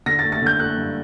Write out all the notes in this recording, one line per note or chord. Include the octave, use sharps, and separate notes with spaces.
D3 A#6
A6
A3
A6
D3 G6
A3 F#6
G2